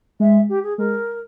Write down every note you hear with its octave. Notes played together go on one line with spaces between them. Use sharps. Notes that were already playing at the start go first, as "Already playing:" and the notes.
G#3 E5
G4
G#4
G#3 A#4